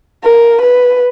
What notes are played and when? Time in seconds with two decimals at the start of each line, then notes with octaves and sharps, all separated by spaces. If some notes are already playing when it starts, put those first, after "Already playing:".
0.24 A#4
0.61 B4